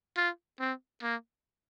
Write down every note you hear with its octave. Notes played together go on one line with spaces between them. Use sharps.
F4
C4
A#3